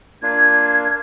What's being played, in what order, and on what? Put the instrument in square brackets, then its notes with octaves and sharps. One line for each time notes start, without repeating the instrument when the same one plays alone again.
[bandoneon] A#3 D4 F4 [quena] G#6